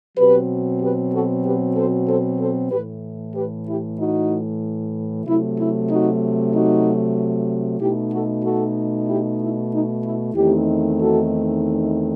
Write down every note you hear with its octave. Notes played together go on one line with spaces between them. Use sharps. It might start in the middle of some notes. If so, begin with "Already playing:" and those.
B2 F#3 C4 G4 B4
G4 B4
F#4 A4
G4 B4
A4 C5
A4 C5
A4 C5
A2 E3 A3 G4 B4
G4 B4
E4 G4
D#4 F#4
C3 F#3 A3 E4
E4
D#4 F#4
D#4 F#4
B2 A3 D#4 E4 G4
F#4 A4
F#4 A4
E4 G4
E4
D#4
E4
E2 D#3 A3 C4 D#4 E4 G4
F#4 A4